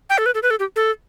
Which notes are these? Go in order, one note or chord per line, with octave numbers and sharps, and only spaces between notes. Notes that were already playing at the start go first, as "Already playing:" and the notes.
G5
A4
B4
A4
B4
A4
G4
A4